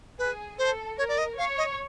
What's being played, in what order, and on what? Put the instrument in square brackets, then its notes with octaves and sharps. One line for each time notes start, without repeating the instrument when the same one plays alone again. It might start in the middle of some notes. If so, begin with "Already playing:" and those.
[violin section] G#4 [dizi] B4
[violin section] A4 [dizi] C5
[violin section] A#4 [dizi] C#5
[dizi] D5
D#5
[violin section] C#5 [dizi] F5
[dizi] D#5